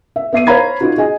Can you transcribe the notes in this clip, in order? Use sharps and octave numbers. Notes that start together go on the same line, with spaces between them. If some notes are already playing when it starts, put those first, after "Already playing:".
E5
B3 E5 C7 D#7
C5 C#5 F5 A#5 B5 G#6
D#4 F4 F#4
G#4 D#5 G#5